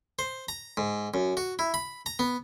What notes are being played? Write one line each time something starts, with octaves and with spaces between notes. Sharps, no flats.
C5
A#5
G#2
F#2
F#4
E4
B5
A#5
B3